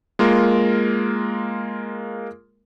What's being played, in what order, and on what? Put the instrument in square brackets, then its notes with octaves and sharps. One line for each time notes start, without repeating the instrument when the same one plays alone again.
[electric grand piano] G#3 A#3 F4 A#4